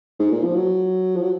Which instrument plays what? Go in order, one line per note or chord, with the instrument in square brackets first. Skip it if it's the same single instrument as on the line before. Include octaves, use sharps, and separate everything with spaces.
[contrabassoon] G#2
A#2
F3
F#3
F3
F#3